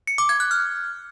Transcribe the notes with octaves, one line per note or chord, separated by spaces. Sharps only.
C#7
D6
G#6
F#6
F6